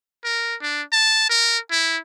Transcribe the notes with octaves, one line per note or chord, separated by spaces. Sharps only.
A#4
D4
A5
A#4
E4